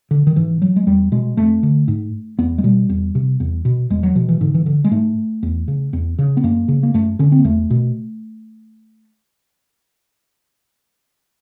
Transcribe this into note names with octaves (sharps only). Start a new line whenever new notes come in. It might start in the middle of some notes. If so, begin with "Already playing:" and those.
D3
D#3
G#2 E3
F#3
G#3
E2 G3
B2 G#3
F2 A3
D3
G#2
E2 B3
G#3
B2 G3
E2
C3
E2
B2
E2 G#3
F#3
B2 F3
E3
G#2 D3
E3
D3
G#3
G#2 A3
E2
C#3
E2
C#3
B3
F#2 A#3
C#3
A#3
F#2 A3
D3 C#4
C4
A#3
E2 A3
B2